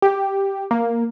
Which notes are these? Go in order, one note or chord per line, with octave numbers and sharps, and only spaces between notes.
G4
A#3